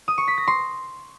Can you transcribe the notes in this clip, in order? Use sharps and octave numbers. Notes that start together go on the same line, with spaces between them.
D#6
C#6
B6
A#6
C6